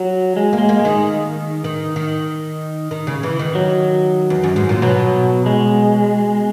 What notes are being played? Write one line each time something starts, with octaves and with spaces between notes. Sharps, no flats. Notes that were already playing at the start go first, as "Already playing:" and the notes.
Already playing: F#3
G#3
A#3
G#3
A#3
G#3
D#3
D#3
D#3
D#3
C#3
E3
D#3
F#3
E2
F#2
G#2
A#2
B2 F#3
G#3